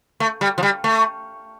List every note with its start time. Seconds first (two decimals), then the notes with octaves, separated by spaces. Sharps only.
0.20 A3
0.41 G3
0.58 F3
0.63 G3
0.84 A3